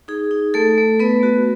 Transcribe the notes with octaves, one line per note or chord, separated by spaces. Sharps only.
D#4 G#4
D#4
A3 A4
A3
A3 B3 B4
F#4